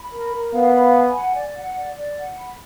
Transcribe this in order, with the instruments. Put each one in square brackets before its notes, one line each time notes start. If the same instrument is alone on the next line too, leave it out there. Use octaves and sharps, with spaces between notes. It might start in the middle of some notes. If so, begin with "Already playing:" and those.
Already playing: [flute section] B5
A#4
A#4
[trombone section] B3 [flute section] F5
[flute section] B5
G#5
F#5
D5
F#5
D5
D5
F#5
B5